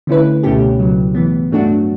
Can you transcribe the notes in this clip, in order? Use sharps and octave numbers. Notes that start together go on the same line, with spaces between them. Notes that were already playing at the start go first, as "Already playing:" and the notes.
D3 A3 C#4 E4 B4
C#2 B2 A3 C#4 G4
C#2 C#3 F#3
A2 E3 B3
G2 F#3 A3 D4 F#4